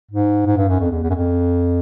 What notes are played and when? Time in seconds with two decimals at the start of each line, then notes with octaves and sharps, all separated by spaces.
0.12 G#2
0.46 G#2
0.57 G2
0.69 F#2
0.80 F2
0.92 E2
1.03 E2
1.10 F#2
1.15 F2